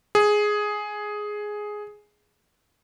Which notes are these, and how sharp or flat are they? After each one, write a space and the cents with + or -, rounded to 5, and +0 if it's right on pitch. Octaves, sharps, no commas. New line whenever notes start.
G#4 +5